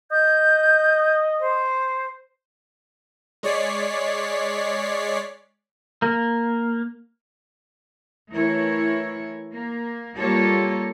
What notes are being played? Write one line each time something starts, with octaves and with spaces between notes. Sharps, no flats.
D#5 G6
C5
G#3 C#5 D5 B6 C7
A#3
E3 A3 E4 A#4 C#5
A#3
G3 A#3 F4 G4 A4 C#5